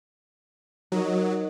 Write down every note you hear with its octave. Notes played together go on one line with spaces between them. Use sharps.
F#3 D#4 A#4 D#5